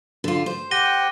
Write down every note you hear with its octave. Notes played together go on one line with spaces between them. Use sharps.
D3 F4
C5
G4 F#5 G5 A#6 D#7 G7